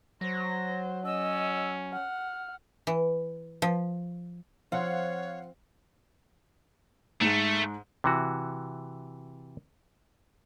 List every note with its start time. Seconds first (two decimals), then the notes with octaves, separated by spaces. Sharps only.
0.21 F#3 C5 A#6
1.05 C#4 D#5 E6
1.93 F#5 F6
2.87 E3
3.62 F3
4.72 F3 C4 C#5 F5 F#5
7.21 G#2 G#3 A3
8.04 C3 E3 F#4